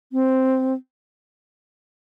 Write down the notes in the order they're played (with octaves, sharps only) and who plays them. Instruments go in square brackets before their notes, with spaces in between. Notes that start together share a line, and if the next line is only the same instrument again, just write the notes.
[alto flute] C4